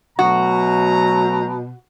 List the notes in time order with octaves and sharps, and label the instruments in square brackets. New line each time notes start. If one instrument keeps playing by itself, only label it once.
[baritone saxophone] B2 [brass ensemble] F#3 A3 A#5 [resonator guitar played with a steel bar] F#4